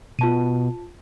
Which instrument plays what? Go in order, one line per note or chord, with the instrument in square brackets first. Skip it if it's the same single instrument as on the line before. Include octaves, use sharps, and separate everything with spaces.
[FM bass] B2 [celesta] F4 A5 D#7